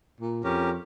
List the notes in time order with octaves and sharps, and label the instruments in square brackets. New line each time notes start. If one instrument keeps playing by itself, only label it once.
[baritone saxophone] A#2
[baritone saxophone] F2 [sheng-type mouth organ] C#4 G4 A#4